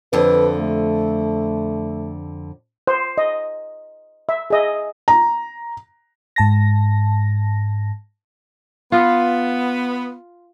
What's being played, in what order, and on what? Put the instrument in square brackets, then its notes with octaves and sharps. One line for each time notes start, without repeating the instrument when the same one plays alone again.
[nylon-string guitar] F2 D3 [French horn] B4
[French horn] A3
[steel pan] C5
D#5
E5
G#4 D#5 E5
[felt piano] A#5
[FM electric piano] G#2 A5 A#6
[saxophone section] B3 [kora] F4